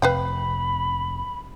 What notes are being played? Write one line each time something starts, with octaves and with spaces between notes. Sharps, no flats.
F1 C3 B4 F5 G5 B5